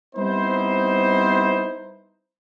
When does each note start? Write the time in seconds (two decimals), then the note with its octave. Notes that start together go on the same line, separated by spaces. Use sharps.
0.16 G3 B3 C4 D#4 E4 C5